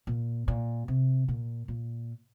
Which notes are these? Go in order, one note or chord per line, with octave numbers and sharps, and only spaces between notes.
A#2
A#2
C3
A#2
A#2